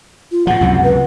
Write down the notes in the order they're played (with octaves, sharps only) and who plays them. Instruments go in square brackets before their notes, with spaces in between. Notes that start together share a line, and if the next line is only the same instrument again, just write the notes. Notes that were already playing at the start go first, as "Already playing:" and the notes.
[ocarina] F4
[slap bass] A2 F3 [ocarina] F#5
[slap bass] C#2 F#2 C3
[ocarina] B4